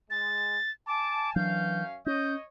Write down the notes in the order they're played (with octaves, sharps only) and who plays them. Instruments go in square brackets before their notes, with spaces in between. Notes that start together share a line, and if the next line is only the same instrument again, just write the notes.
[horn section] G#3 [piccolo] A6
[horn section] G#5 A5 [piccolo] D6
[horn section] F#2 C#4 F5 [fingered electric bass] E3 F#3 D4 [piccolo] G6
[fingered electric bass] C#4 [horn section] C#5 D#5 [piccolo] G6